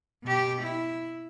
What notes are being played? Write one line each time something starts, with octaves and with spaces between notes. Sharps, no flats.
B2 G4
E4